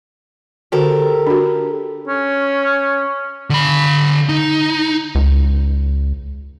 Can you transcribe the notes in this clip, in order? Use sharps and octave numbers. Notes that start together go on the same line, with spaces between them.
D3 F#4 G4 A4 A#4
D4 F#4
C#4
D3 B5
D#4
C#2